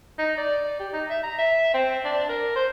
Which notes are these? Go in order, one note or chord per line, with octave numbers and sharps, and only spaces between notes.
D#4
D5
G4
D#4
E5
A#5
E5
C4
D4
A#4
C5